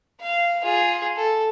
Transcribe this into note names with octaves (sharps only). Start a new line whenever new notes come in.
F5
F4 G#4
A4